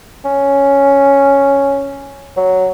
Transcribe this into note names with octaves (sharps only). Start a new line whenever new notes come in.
C#4
F#3